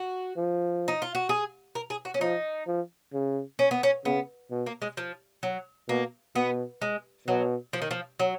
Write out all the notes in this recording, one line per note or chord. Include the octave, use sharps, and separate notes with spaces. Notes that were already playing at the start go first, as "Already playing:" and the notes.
Already playing: F#4
F3
D#4
F4
F#4
G#4
A#4
G#4
F#4
C#4
F3 D#4
F3
C#3
C#4
B3
C#4
C#3 B3
B2
A#3
G#3
F3
F#3
B2 A#3
B2 B3
G#3
B2 F#3
F3
D#3
F3
F#3